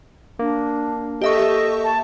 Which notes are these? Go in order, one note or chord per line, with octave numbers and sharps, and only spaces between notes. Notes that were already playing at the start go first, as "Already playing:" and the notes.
A#3 D4
G4 A4 D#5 E5 C#6
A5